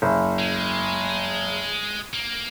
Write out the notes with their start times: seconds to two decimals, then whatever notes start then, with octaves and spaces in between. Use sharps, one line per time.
0.02 F#1
0.39 G#3
2.13 A#3